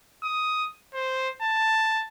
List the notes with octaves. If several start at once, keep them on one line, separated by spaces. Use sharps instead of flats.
D#6
C5
A5